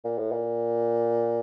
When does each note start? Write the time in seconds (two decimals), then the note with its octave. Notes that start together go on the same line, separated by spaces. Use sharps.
0.05 A#2
0.18 A2
0.32 A#2